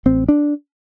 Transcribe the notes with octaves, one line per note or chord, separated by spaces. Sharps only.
A1 C4
D4